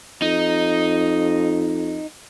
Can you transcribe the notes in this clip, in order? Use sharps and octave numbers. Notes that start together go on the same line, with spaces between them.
F2 D#4